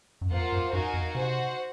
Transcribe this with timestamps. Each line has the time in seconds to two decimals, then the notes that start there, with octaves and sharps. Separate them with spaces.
0.21 F#2
0.31 F2 A#3 F4 C5 F#5
0.52 F#2
0.72 F#2 D#4 F#4 A#4 F5 G#5
0.94 F2
1.14 C3 F#4 C5 F#5